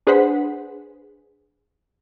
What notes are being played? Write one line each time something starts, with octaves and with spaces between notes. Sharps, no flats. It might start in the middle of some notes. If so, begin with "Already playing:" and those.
D4 G#4 B4 C5 F#5 B6